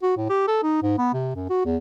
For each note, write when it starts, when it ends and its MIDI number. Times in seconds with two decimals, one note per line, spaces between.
0.02 0.15 66
0.17 0.26 45
0.29 0.44 67
0.48 0.58 69
0.63 0.79 63
0.82 0.96 44
0.98 1.13 59
1.13 1.31 48
1.35 1.47 42
1.49 1.61 66
1.65 1.77 40